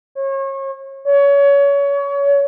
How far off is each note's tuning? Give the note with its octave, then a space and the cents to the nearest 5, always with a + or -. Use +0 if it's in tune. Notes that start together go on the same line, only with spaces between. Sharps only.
C#5 -35
C#5 +25